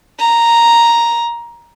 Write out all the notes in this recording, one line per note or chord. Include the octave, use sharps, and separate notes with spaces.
A#5